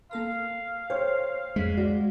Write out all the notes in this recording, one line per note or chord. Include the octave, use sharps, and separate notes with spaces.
A#3 A4 A#4 F5
A4 C5 C#5 G5
F2 G#3 B6
F#4 D5